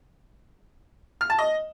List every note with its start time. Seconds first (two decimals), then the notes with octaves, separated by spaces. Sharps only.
1.21 F6
1.30 A5
1.39 D#5